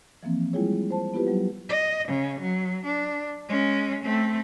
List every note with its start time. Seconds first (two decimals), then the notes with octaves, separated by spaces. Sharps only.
0.23 E3 F3 A#3 C4
0.53 G3 G#3 E4 F4 G#4 C#5
0.91 C5 A5
1.14 B3 E4 F4 G4 B4
1.27 F#3 G3
1.69 D#5
2.07 C#3
2.40 F#3
2.84 D4
3.48 G#3 C#4
4.04 A3 C4